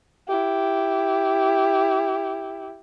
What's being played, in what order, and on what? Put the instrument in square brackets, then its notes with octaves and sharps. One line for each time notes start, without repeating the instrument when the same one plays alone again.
[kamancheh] E4 G4